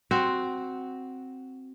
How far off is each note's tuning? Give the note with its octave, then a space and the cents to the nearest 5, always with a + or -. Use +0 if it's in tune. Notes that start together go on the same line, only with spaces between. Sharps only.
C4 +0 F#4 +0